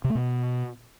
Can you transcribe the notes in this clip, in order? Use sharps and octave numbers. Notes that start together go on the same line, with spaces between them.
C3
A3
B2